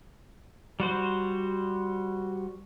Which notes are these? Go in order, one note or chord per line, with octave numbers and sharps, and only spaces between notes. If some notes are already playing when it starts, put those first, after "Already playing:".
G3 F#4 C5